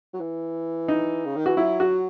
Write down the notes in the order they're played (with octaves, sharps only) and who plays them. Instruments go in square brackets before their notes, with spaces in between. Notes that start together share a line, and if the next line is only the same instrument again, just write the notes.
[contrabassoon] F#3
E3
[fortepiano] D#4
[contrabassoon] C#3
D#3
[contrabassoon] E3 [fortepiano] F#4
[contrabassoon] F#3 [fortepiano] E4
[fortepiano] F#4